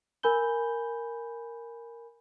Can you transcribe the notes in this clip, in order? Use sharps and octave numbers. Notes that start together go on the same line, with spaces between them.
A#4 G#5 B5 G6 G7